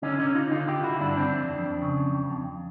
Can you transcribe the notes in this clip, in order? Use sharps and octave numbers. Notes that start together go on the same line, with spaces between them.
D3 C#4 D#4
D3 C#4 D#4
D3 D#4 F4
D3 D#4 F4
D3 F4 G4
D3 E4 F#4
G2 D4 E4
D3 C4 D4
F2
F2
F2
C#3
F2
F2
F2